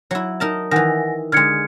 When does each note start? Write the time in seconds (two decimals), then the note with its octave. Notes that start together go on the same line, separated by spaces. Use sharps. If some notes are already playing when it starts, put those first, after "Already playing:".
0.11 F#3 E4
0.40 D#4 A#4 A5
0.71 D#3 E3 F#5 G#5 A#6
1.32 D3 G#3 F6 G#6 C#7